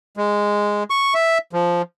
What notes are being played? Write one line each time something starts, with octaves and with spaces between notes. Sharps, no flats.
G#3
C#6
E5
F3